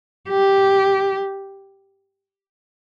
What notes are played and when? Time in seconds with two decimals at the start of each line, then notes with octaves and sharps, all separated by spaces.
0.29 G4